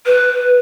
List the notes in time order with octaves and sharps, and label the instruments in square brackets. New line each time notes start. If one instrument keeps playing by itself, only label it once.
[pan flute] B4